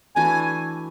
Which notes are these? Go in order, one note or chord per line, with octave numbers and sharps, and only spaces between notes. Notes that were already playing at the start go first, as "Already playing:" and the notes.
E3 A3 D4 F#4 G#5